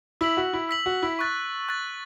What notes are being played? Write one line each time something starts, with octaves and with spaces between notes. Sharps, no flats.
E4 E6 B6 F#7
F#4
E4
E6 B6 F#7
F#4
E4
C#6 F#6 A6
C#6 F#6 A6